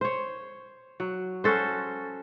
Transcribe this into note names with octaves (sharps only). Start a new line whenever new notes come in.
C5 C#5
F#3
C#4 F#4 A4 C5